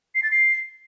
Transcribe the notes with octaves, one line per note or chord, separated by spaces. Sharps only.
C7
A6
C7